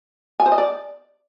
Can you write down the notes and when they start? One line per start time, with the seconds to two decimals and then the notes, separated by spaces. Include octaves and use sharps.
0.40 G#5
0.46 C5
0.52 D#5
0.58 D5